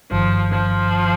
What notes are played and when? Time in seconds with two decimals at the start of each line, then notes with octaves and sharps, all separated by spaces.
0.11 G1 G2 D#3 F3
0.52 F3